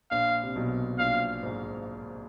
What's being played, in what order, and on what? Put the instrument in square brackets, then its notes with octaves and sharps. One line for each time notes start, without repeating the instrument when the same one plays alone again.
[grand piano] A#1 A#2 [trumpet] F5
[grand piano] C3
B1 B2
[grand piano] A#1 A#2 [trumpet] F5
[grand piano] G#1 G#2